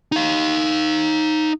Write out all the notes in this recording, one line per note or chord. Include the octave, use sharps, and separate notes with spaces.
D#4 F5